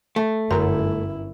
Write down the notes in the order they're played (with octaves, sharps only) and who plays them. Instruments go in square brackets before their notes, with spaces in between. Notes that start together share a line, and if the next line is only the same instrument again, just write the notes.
[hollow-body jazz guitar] A3
[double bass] G1 E4 [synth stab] F#2 [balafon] D3 A#5